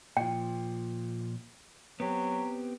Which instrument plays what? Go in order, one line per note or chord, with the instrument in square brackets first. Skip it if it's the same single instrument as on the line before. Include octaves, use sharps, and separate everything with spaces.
[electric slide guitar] A#2 F3 [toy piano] G5
[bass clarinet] F#3 [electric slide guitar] B3 C4 G4